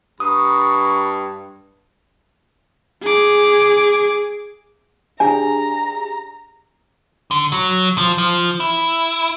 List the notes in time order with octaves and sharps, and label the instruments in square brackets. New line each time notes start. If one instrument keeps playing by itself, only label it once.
[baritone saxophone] G2 [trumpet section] A#5 B5 C#6 [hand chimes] D#6
[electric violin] G#4 D6
[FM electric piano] D4 G4 G#4 [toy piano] G#5 [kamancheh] A#5
[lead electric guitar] D3
F#3
F3
F3
E4